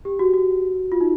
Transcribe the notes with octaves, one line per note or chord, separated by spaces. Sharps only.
G4
F#4
F#4
F4
D#4